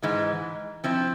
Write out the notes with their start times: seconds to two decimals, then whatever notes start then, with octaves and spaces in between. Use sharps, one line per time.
0.02 G#2 E3 G#3
0.84 F3 C4 E4